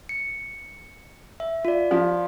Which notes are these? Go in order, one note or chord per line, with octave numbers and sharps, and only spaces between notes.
C#7
E5
F4 D5
F3